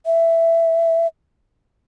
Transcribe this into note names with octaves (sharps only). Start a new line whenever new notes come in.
E5